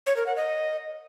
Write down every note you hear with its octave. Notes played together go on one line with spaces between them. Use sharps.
C#5
A#4
F#5
D#5